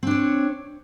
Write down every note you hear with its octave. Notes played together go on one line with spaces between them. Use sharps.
C4 D4 C#5